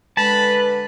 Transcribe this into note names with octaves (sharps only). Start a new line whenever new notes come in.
D3 G#3 B4 A5 B5